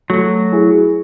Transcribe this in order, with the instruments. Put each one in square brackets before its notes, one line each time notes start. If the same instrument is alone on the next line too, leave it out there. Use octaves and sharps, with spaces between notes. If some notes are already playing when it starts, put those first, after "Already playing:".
[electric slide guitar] F#3 [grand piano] A3
[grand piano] E4 G#4